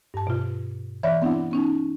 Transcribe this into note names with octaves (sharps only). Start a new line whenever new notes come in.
G2 A5
B2 F4
E3 C#5 D5 E5 B5
B3 C4 D4 E4 F#5
B3 C#4 D#4